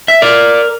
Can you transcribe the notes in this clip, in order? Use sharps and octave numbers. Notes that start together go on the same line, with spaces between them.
E5
A#4 D5